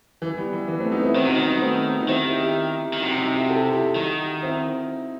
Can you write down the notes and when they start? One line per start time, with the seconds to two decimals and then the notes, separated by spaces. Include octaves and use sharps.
0.22 E3
0.37 G3 B3
0.53 E3
0.68 E3
0.80 A3 C4
0.92 B3 D#4
1.03 C4 E4
1.15 D#3 C4 E4
1.24 C3 D#4 F#4
1.35 D#3 D#4 F#4
1.50 B3 D#4
1.62 A3 C4
2.00 D#4
2.08 D#3 C4 E4
2.24 E4 G4
2.40 E4 G4
2.93 D#3
3.02 C3 D#4 F#4
3.18 D#4 F#4
3.34 E4 G4
3.49 F#4 A4
3.72 E4 G4
3.96 D#3 D#4 F#4
4.43 C4 E4